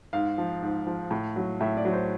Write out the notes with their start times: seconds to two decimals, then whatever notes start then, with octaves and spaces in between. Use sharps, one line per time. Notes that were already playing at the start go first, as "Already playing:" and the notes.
0.13 G#2 F5
0.38 F3
0.62 G#2
0.87 F3
1.11 A2
1.36 F#3
1.61 A2 E5
1.77 D5
1.85 F#3
1.93 C5